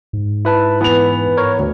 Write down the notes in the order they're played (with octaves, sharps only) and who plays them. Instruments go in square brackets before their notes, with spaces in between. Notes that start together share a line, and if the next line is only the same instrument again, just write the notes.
[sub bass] G#2
[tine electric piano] E4 B4 A5
[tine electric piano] E3 [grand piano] B3 F7
[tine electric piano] A#4 C#5
D2